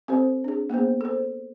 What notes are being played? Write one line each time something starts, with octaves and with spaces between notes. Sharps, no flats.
C4 G4 A4 C5
D4 G#4
A#3 B3 G#4 C5
A4 C5